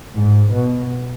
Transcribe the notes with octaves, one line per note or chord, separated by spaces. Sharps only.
G#2
B2